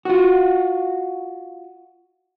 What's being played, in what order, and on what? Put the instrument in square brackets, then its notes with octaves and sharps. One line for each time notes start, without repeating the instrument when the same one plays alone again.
[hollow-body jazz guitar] F4 F#4